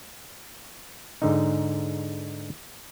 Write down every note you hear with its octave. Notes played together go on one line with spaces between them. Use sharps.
G#2 D3 D#4